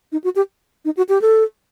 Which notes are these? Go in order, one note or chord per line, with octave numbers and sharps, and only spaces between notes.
D#4
F#4
G4
D#4
F#4
G4
A4